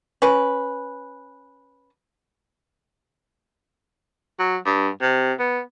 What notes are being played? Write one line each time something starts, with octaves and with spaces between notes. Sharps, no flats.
C#4 B4
F#3
G2
C3
B3